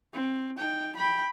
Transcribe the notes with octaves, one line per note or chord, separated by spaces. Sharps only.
C4
D#4 G5
G5 B5